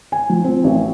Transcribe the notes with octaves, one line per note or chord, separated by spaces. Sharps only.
G#5
F3
C4
A1